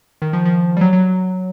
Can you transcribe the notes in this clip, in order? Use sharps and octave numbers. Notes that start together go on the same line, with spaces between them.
D#3
F3
F3
G3
F#3
F#3